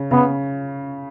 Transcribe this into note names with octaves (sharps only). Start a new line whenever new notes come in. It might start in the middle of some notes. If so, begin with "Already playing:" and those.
Already playing: C#3
C#3 B3